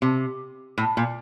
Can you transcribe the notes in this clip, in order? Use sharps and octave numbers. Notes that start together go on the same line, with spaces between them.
C3
A2
A#2